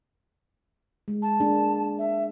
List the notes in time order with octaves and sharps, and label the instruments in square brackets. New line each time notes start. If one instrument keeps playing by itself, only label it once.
[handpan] G#3
[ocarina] A5
[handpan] A#3 D4 G#4
[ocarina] E5